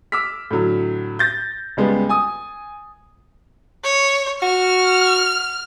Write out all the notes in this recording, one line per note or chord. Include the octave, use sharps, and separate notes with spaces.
D6 E6 F6 B6
A2 D3 F#3
G6 A6 A#6
C#2 G3 G#3 B3
G#5 D#6
C#5
F#4 F6